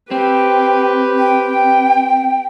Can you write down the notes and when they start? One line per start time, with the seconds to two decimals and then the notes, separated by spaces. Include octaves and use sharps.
0.11 C4 G4 B4 G5
1.18 G5